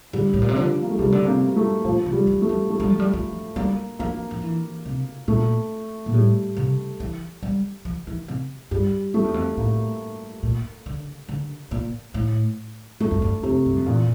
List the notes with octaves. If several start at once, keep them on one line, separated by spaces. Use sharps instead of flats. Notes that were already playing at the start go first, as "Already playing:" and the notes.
D3 G3
A2
A#2
C3
D3 F3
A#3
A3
C3 G3
D3
C3 A#3
A3
A#2 F3
C3
G3
E3
A3
F3
A3
G3
F3
G3
F3
G3 A#3
F3 A#3
F3
E3
C3
A#2 A3
A#2
A2 G3
C3
E3
G3
F3
E3
C3
G2 G3
F2 A3
E2
F2
A2 A#3
A#2
D3
D3
A#2
A2
G2 A3
F2
G2
F2 C3
G2
F2
E2 A#2